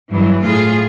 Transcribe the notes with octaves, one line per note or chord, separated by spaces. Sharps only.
G2 E3 F#3
A2 F4 G#4